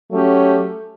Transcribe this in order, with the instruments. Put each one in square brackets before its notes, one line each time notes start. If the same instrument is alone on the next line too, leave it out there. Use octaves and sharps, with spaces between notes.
[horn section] F#3 C#4 G4 [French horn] A3